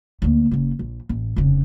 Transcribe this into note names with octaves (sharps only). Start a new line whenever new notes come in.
D2 A#3
F#1 C#3
A#1
A1
F1 C#3